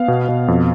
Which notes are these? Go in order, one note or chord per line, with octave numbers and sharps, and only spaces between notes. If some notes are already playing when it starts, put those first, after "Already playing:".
Already playing: B3 F5
B2
B2
F2